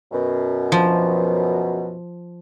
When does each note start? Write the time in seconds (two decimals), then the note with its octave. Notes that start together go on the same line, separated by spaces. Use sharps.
0.12 F#2 B2
0.72 F3